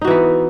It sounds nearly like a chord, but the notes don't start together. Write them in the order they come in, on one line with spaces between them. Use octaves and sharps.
D#4 F#4 E3 B3